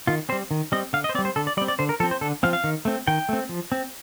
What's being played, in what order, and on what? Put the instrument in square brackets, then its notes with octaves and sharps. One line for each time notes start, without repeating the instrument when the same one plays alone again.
[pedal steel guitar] D#3 F4
C4 C5
G3
D#3
G3 C4 D#5
D3 F5
D#5
C5
C4 D5
G3
C5
D3 A4
D5
G3 D5
C4
D5
D3 C5
A#4
F3 A4
C4
C5
D3 A4
F3 C4 F5
F5
D#3
A3 C4
D#3 G5
A3 C4
F3
C4